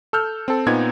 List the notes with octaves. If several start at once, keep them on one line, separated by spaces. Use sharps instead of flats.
A4 E6 F6 G6
C4 A4
A#2 B3 C4 D#4 G#6